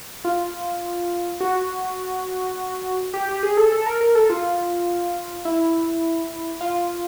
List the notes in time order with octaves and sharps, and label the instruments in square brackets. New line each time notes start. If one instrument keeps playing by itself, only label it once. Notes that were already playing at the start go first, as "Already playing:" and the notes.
[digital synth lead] F4
F#4
G4
G4
G#4
A4
A4
A#4
A#4
A4
F4
E4
F4